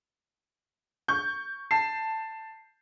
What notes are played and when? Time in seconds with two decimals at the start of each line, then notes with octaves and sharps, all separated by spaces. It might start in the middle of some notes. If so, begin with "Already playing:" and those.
1.08 C#6 G6
1.71 A5 C7